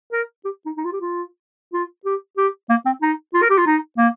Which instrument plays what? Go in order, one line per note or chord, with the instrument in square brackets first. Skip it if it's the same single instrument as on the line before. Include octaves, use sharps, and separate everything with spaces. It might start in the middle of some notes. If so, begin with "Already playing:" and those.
[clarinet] A#4
G4
D#4
D#4
F4
G4
F4
F4
G4
G4
A#3
C4
D#4
F4
A#4
G4
F4
D#4
A#3